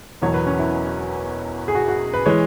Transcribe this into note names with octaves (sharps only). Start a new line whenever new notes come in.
E1 E2 B2 F#3 C#5
B4
C#4
E4
G#4
F#4
F#4
B4
E3 G#3 C#5